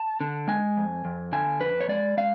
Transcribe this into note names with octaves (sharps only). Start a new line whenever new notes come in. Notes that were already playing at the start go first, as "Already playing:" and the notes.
Already playing: A5
D3
G#3 G#5
F2
F2
D3 G#5
F2 B4
C#5
G#3 D5
G#3 F5